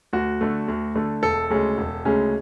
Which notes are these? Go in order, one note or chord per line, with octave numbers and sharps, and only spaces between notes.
D2 F#4
D3 A3
D2
D3 A3
E1 A4
D2 C#3 G#3 C#4
E1
D2 C#3 G#3 C#4